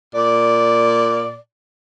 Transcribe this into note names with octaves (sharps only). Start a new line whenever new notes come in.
A#2 D5